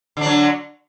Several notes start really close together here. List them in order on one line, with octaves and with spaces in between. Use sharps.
D3 D4 F#3